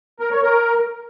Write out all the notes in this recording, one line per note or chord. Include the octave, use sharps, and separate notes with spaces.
A#4
C#5
A#4